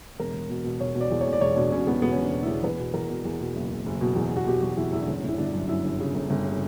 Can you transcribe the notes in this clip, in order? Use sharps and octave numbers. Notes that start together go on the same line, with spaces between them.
E1 A#4
E1
B2
B2
E1 C#5
B2
D5
E2
C#5
E1
D5
E1 C#5
B2 D4
B2 C#4
E2 B3
B2 B3
C#4
E1
D4
E1
E4
E2
E2 B4
B2
E2 A#4
B2
E2
B2
F#1
F#1
F#1
B2
E2
B2 F#4
B2 G4
E2 F#4
E2 E4
E2 E4
D4
G1 C#4
G1 E4
G1 D4
F#2
F#2 E4
G1
C#3
G1
G1
C#3